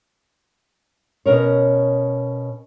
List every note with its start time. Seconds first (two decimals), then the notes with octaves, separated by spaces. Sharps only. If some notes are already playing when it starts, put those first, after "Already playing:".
1.26 B2 C#4 A#4 C#5